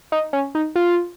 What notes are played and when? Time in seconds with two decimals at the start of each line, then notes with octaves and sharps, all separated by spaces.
0.12 D#4
0.33 C#4
0.55 D#4
0.76 F4